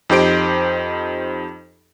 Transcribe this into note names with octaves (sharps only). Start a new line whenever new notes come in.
F2 D#4 G4 C5 D7